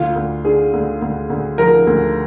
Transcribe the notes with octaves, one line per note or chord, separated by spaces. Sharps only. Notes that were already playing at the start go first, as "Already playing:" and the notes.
Already playing: D2 F4
D2
D3 G#4
D2
D2
D2
F3 A#4
D2